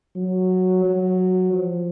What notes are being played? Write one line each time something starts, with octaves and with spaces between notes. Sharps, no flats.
F#3
F#3
F3